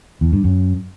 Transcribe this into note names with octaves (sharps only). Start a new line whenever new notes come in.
E2
G2
F#2